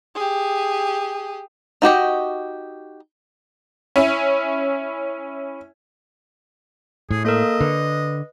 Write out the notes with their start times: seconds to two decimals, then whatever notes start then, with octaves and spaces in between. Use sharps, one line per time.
0.16 G4 G#4
1.82 D#4 F#4 G4 D#5
3.96 C#4 E4
7.11 A2 G#4
7.25 A#3 A4 A#4 D#5
7.61 D3 B4